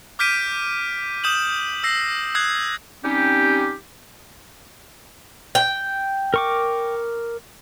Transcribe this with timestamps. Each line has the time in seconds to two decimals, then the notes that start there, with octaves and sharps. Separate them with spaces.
0.19 D6 F6 G6 B6 D7 D#7
1.24 D#6 G6 E7 F#7
1.83 E6 A#6 C7
2.35 D#6 F#6 G#6 C7
3.04 G3 C4 C#4 D#4 G4
5.55 G5
6.34 A#4 C#6 D6